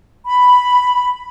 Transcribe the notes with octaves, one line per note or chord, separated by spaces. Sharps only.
B5